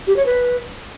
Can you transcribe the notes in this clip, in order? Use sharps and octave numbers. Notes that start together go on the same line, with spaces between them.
G4
C#5
B4